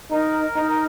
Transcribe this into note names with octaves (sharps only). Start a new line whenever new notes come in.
D#4 A#4
D#4